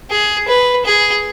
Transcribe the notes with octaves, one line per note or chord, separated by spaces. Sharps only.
G#4
B4
G#4